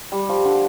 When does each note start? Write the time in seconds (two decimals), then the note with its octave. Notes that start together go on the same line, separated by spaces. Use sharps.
0.12 G3
0.29 F3
0.45 D3